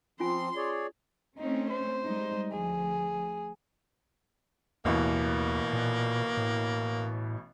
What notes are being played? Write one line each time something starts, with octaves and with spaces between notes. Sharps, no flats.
F3 C4 C#4 F4 G#5 C6
G#4 C#5 D5
A3 C4 C#4 D#4
C5
G3 G#3 D#4
D2 F3 G#4
A1 D#2 B2 E3 A#3
A#2
A2